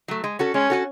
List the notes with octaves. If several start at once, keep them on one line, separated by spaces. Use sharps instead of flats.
F#3 A3
G#3
C#4 F#4 A4
G#3 C#4
C#4 F#4 A4